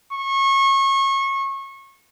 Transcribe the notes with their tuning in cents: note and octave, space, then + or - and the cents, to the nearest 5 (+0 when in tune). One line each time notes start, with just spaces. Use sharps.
C#6 -25